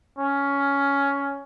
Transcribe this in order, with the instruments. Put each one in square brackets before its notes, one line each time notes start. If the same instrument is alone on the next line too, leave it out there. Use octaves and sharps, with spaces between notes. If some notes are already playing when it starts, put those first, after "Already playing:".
[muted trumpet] C#4